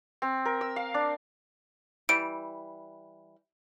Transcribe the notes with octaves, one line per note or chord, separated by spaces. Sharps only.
C4
A#4
E6
F5
D4
E3 G3 D7